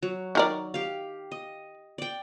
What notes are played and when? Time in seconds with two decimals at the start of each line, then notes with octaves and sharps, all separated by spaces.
0.03 F#3
0.35 D#3 A#4 D5
0.74 G4 F5
1.32 D#5
1.98 D5 G5